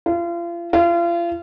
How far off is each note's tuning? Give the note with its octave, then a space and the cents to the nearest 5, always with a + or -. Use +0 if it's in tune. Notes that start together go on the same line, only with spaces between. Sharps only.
F4 -35
F4 -35